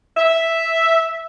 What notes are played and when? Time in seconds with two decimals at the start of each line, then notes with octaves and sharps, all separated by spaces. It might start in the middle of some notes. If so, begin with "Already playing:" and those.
0.17 E5